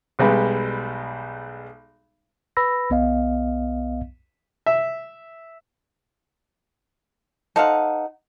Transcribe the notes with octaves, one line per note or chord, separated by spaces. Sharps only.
B1 G3 G#3 B3
B4 B5 E6 A#6
B1 B3 D#5 F5
E5
D#4 A4 C5 F5 F#5